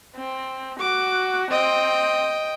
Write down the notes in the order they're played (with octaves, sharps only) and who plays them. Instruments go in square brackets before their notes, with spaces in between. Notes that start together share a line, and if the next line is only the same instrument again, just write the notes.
[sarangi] C4
[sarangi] F#4 [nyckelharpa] D6
[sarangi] C4 [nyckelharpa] D#5 G5